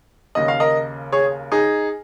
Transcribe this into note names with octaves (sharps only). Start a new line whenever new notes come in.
D#2 C#3 A#3 D#5
F5
A#4 D#5
G#4 C#5
D#4 G#4